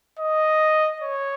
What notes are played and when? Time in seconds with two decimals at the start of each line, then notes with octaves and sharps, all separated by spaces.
0.19 D#5
1.02 C#5